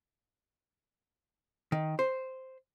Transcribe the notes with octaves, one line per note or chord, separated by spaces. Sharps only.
D#3
C5